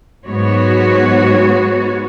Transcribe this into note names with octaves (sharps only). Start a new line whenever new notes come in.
G#2 F#3 B3 F#4 C#5